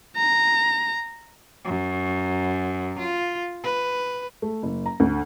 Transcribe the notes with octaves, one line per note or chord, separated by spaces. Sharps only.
A#5
F#2
F4
B4
A3
F#1
A#5
D2